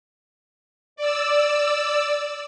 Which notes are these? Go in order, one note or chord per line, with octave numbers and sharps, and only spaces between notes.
D5 E6